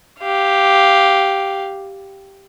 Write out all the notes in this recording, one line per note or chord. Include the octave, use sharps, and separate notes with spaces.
G4 F5